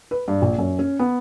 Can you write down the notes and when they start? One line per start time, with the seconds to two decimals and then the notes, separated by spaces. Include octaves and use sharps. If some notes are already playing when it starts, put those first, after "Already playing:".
0.11 B4
0.28 G2
0.42 A#1
0.58 F#2
0.79 C#4
0.99 B3